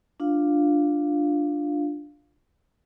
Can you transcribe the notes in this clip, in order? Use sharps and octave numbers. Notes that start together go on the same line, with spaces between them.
D4 F4 F5